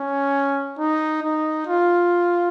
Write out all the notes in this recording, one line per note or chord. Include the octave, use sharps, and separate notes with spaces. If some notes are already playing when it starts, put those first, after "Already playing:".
Already playing: C#4
D#4
D#4
F4